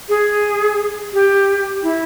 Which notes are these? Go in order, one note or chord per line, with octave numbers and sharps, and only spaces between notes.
G#4
G4
E4